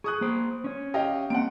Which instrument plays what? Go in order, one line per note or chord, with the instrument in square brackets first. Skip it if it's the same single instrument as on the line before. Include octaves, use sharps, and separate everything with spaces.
[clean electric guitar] G#4 [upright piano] C#6 D#6 F#6
[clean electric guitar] A#3 C5
C#4 C#5
[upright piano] G4 D#5 F5
[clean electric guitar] A#3 C4 [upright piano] F#5 D7